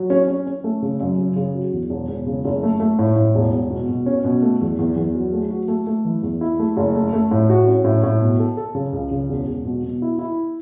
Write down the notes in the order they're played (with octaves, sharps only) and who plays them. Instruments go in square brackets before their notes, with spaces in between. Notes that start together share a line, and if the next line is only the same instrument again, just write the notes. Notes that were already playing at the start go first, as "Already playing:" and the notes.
Already playing: [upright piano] F#3
C#4
C#4
C#4
A3
C#3
F#2
C#3
C#3
F#3
E2
E1
E1
C#3
F#1
A3
A3
A2
A2
E1
E1
B2
B2
C#4
B2
A3
E2
E2
E2
F#3
A3
F#4
A3
A3
E3
E2
E4
A3
F#1
A3
A3
A2
F#4
C#4
A2
A2
B2
A4
A4
C#3
C#2
C#3
E1
E1
B2
B2
E4
E4